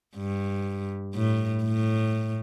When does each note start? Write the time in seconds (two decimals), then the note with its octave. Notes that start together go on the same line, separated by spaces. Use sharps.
0.16 G2
1.15 A2
1.64 A2